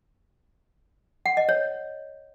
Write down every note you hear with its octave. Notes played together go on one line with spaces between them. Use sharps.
F#5
D#5
C#5